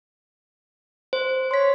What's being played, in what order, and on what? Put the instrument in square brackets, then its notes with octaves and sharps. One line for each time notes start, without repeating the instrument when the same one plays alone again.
[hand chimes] C5
[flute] C#5 [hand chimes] C6 B6